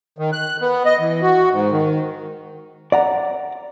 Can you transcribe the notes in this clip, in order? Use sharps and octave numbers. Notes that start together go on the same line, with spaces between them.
D#3
F#6
B3
D#5
E3
F#4
G#2
D#3
D5 F#5 A#5